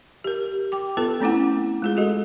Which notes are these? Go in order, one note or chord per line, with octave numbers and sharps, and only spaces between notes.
G4 A#4
G5 D6
B3 F4 A4 B4
A3 C4 C#4 E4 F#5
G#3 F4 G#4
F#4 A4 D#5